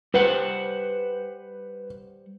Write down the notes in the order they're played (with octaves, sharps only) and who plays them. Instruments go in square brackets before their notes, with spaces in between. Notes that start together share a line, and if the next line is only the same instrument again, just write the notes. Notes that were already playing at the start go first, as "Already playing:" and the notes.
[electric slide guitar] G3 C5 F#5 [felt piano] B4